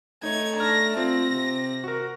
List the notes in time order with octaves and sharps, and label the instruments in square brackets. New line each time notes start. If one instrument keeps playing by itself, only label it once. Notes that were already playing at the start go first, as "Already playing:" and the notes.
[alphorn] A3 [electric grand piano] D#4 C#5 [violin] G#6
[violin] D4 A#6 [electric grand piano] A#5 F6
[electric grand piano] C4 [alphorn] F4 [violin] A#6
[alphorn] C3
[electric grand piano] F#4 A#4